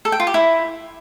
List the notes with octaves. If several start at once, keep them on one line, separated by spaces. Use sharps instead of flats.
A4
G5
F4
G4
E4